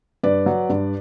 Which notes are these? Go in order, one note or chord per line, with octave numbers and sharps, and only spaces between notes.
G2 B4 D5
F#3
G2